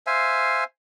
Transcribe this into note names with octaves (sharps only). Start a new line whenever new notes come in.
C5 E5 F5 G#5